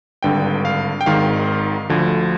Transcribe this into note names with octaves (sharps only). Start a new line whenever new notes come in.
G#1 G2 D3 G5
F5
G5
G#1 G#2 D#3 F5
D2 D3 F3